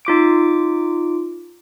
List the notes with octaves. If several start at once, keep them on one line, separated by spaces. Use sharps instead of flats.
D#4 F4 D6 D7